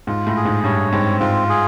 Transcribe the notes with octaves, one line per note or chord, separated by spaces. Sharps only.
G#2 F4
A2
G#4
G#2
G2 C#5
G#2 C4
G#2 F4
G#4